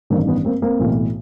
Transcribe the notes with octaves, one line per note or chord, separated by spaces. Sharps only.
A1 G2 D#3 A#3 C4
B3 C#4
A#3 C4
A#3 C4
B1 A2 E3